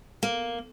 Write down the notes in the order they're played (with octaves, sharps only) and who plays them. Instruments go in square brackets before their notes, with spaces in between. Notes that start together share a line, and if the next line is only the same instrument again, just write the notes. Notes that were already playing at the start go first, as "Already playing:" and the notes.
[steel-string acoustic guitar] A#3